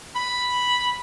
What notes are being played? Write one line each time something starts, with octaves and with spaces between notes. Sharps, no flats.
B5